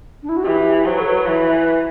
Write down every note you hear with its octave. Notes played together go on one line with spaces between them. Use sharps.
D4
E4
F#4
E3 G4
F#3 C5
B4
A4
B4
E3